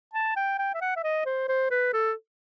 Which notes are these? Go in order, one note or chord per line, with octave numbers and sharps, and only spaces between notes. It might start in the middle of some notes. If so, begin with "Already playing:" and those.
A5
G5
G5
E5
F#5
E5
D#5
C5
C5
B4
A4